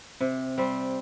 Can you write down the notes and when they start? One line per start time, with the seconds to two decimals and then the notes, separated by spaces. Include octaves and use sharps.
0.20 C3
0.58 G3 C4